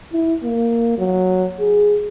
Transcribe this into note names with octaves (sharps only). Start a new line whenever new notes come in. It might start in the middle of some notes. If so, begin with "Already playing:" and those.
E4
A#3
F#3
G#4